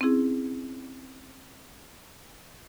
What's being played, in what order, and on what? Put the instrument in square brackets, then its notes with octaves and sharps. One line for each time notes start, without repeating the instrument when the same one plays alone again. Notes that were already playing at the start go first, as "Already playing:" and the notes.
[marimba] C4 C#4 E4 G#4